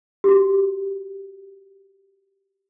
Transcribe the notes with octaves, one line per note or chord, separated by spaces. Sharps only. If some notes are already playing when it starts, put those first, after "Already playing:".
F#4 G4